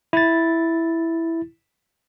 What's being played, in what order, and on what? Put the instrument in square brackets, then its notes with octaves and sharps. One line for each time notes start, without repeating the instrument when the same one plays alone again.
[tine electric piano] E4 A6